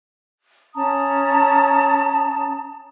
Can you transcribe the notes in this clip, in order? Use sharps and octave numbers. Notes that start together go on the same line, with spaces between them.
C#4 A5 A#5 D#6